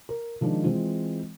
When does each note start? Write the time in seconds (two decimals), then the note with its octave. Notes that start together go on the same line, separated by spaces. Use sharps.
0.09 A#4
0.41 D#3 F3 G#3 D4
0.64 E3 G#3 C4 F4